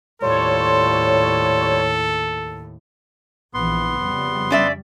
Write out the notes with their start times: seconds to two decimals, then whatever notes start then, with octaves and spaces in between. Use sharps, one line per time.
0.22 D#2 A2 G3 F4 A4 C5 C#5
3.54 A#1 E3 B3 C6
3.99 F2 C#3 G3
4.51 C#4 D5 E5